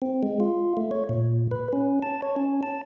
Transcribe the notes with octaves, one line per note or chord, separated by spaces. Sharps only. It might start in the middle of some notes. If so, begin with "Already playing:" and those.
C4
G#3
F4
A3
C#5
A#2
B4
C#4
A5
C#5
C#4
A5